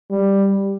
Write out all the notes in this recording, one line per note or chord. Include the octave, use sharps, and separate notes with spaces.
G3